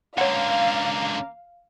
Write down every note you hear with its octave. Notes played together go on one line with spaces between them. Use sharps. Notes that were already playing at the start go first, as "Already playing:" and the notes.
C#2 D3 A#3 C#5 F5 F#5